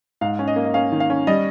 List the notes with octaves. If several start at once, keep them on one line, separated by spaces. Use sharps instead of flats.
G#2 F5
C#4
D#5
A#3
D#5
C#4 F5
D#3
F5
C#4
G3 D#5